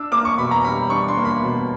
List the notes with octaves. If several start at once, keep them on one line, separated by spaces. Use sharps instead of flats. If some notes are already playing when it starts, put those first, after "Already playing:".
Already playing: D4 E6
A#3 D6
C#6
B2 B5
A#5
G3 B5
D4 C#6
C6
A#3
B5
B2